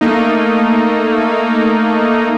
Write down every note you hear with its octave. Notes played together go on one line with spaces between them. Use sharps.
A3 A#3 D#4